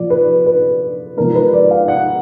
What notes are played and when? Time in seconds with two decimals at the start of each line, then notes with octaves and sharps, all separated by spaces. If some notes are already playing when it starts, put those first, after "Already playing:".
Already playing: A#2 F3 D5
0.10 B4
0.46 B4
1.17 G#2 F3 A#4
1.35 B4
1.53 D5
1.71 F5
1.88 F#5